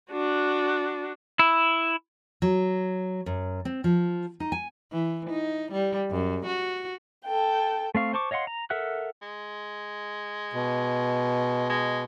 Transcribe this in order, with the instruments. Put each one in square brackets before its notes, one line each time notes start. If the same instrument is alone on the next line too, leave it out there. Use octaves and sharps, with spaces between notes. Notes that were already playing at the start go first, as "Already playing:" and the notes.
[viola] D4 F#4
[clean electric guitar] E4
[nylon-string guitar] F#3
F#2
C4
F3
D#4
G#5
[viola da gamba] E3
D#4
G3
F#2
F#4
[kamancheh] A4 G5
[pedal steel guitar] A3 C4 F5 C#6
C5 A5 C#6 D6
C#5 D#5 F5 F#5 C6
A#5
A4 A#4 E5 F#5 F#6
[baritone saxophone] G#3
[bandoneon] B2
[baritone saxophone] G#3